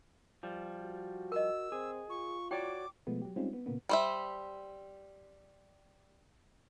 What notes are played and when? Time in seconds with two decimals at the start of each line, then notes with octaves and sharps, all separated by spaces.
0.43 F3 G3
0.82 F#4
1.32 A#4 D#5 E6
1.72 C4 G#4
2.10 F4 C#6
2.51 E4 F#4 C#5 D5 G5 D6
3.07 B2 F3 G#3 A3 B3
3.22 F#3 G4
3.36 G3 G#3 C4 C#4 D#4 F4
3.53 B3
3.66 A#2 C#3 A#3 B3
3.89 G3 C5 E5